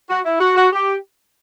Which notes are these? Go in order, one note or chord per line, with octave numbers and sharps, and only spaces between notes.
F#4
E4
F#4
F#4
G4